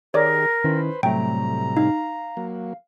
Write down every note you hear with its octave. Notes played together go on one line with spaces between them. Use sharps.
D#3 G4 G#4 A#4 C#5 D5 D6
D#3 C#4 E4 B4 C5
A2 C3 F#3 G3 A3 G5 A#5
D#4 F5
F#3 A#3